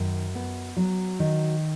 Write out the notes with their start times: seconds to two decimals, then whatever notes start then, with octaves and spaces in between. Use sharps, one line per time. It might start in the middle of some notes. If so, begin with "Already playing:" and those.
Already playing: F#2 D#3
0.35 B3
0.76 F#3
1.19 D#3